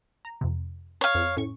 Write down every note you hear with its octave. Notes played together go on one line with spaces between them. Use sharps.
A#5
F2 C3
C#5 F5
F2
A2 C#4 C#6